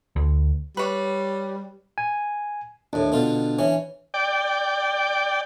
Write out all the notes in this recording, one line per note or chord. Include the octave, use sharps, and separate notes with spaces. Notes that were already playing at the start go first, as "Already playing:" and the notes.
D2
G3 B4 C#5 D5
G#5
D#2 A2 D4
B2 D3 F4
E3 C#4
D5 G5